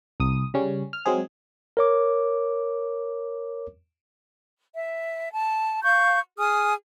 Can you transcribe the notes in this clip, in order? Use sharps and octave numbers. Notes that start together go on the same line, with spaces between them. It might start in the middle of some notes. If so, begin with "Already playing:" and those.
C2 D#6
C#3 G3 C#4
F6
F#3 G#3 C4 G#4
A#4 C#5 D6
E5
A5
F5 C#6 G6
G#4 G#5 D#6 F6